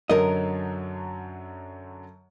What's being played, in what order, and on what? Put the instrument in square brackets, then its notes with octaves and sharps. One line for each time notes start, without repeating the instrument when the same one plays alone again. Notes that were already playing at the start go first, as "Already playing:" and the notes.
[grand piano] F#2 D3 F#3 [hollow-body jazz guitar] A#4 D#5